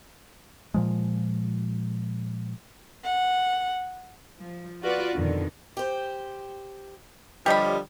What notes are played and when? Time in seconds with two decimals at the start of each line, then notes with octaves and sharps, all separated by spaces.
0.74 A#2 F3 G#3
3.04 F#5
4.40 F3
4.82 F4 F#4 B4 D5
5.15 F2 B2 D3 D#3
5.77 G4 C5
7.46 D3 F3 G3 G4 C#5 D#5 B5